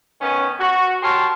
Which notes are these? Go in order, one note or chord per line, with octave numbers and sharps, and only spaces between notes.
D#3 B3 C#4
F#4
G4 A#4 C#5 A5 C6